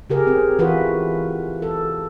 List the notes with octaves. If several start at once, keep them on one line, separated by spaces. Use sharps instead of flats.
C#3 G4 G#4 A#4
C4 G#4
E3 F4 F#4 G#4 B4
A4